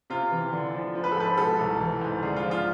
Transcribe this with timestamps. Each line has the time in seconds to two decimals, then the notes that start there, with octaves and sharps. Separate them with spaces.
0.10 C3 F4
0.32 E3
0.53 D3
0.74 F3
0.95 F3
1.04 B4
1.12 A4
1.17 G#2 B4
1.38 B2 A4
1.59 C2
1.80 E3
2.01 G#2
2.22 D3 G#4
2.36 F4
2.44 F3
2.51 F4